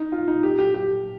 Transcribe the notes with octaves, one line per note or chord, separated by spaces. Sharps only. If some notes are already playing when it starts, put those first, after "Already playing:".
Already playing: D#4
F4
D#4
G4
G4
G4